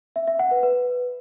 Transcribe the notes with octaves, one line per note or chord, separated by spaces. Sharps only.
E5
E5
F#5
B4
B4